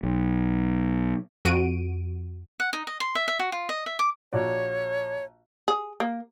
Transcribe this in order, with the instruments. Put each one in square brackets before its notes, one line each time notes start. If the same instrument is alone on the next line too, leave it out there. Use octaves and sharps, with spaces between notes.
[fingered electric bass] B1
[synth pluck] F2 F#4 D7 D#7
[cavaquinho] F#5
D#4
D#5
C6
E5
E5
F#4
F4
D#5
E5
D6
[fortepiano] A#1 F#4 D5 [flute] C#5
[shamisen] G#4
A#3